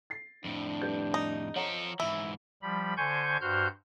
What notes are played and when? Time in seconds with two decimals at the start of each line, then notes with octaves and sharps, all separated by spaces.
0.10 A6 C7
0.44 F2 A2 D4
0.82 G3 B4 G6
1.14 D#4
1.56 F3 A4 C#5 F#5 A#5
2.00 G#2 E3 E4
2.62 F3 G3 B5
2.97 D3 C5 G#5 C#6 G6
3.41 G2 F#4 C5 F6 G6